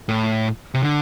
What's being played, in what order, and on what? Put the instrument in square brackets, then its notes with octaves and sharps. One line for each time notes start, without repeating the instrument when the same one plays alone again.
[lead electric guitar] A2
C3
D3